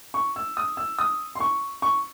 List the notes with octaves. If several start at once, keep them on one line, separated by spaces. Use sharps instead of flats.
C#6
E6
D#6
E6
D#6
C6
C#6
C#6